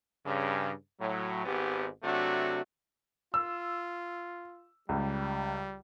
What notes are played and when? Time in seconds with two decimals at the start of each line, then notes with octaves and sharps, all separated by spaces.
0.25 G2 C#3
1.00 A2 F#3
1.45 G#1 G#2 B3 G4
2.03 C3 F#3 A3 D4 F#4
3.34 F4 E6
4.89 C#2 G3